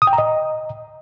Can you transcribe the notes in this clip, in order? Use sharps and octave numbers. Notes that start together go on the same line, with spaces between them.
D#6
G5
A#5
D#5